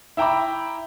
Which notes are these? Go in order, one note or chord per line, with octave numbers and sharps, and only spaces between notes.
E4 E5 G5 A#5 B5 D6